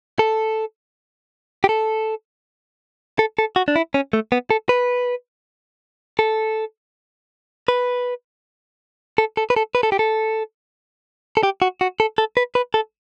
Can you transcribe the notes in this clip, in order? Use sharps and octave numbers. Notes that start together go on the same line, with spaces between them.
A4
G4
A4
A4
A4
F#4
D4
E4
C#4
A3
B3
A4
B4
A4
B4
A4
A4
B4
A4
B4
A4
G4
A4
A4
G4
F#4
F#4
A4
A4
B4
B4
A4